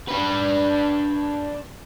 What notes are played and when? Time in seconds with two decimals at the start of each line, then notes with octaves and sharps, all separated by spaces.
0.08 D4 B4